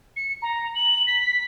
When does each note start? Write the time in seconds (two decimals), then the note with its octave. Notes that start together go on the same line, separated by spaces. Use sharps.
0.16 C#7
0.42 A#5
0.75 F#7
1.07 B6